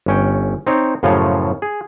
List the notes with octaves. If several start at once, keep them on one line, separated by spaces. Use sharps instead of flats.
G1 C#4 G5
C4 D#4 C#5
F#2 A2 C#3 F3 F4 C#5
G#4